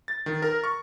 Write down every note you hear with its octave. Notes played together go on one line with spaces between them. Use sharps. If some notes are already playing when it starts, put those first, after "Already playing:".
A6
D#3
A#4
C#6